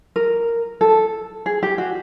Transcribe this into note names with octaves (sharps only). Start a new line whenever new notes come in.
A#4
A4
G#4
G4
F#4